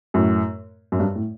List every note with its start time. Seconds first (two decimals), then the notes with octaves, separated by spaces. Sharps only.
0.14 F#2 A2
0.92 F#2
1.00 G2
1.15 A2